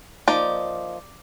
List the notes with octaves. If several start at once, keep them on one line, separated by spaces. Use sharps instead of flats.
F3 A#3 D#4 D5